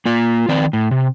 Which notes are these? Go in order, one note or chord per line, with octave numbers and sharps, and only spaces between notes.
A#3 F4
D#3 C4 D5
A2
C3